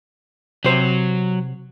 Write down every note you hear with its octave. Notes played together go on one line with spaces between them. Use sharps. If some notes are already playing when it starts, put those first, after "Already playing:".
C3 F#3 C5